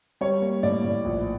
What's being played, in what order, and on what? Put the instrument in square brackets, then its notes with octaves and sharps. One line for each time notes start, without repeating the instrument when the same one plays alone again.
[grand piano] G3 C#5
A#3
A2 D5
A2
A#1